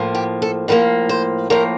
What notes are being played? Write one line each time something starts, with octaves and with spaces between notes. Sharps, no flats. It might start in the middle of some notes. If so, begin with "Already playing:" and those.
Already playing: A2 F3 A#3
G4
A4
A2 F3 A#3 A#4
C5
A2 F3 A#3 A#4